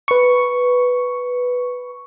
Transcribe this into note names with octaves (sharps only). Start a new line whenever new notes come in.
B4 C#6